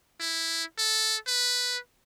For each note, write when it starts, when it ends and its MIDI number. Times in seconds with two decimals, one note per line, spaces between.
0.20 0.64 64
0.78 1.16 69
1.28 1.77 71